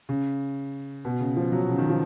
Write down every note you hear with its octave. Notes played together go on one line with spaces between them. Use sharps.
C#3
B2
C#3
F3
F#3
C#3
D#3
F3